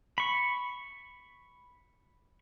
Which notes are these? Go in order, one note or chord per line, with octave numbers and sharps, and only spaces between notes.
B5 C#6